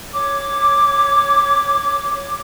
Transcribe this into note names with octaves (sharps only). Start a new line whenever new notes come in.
C#5 D6